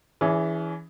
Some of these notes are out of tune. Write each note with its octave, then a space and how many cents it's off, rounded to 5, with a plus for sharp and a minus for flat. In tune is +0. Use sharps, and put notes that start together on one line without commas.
E3 +0 C#4 +35 G#4 +0